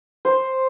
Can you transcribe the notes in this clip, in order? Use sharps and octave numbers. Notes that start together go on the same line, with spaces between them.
C5